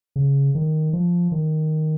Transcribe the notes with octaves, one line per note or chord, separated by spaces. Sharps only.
C#3
D#3
F3
D#3